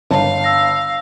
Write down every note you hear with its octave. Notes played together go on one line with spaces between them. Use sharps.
G1 F5 A5
E6 A#6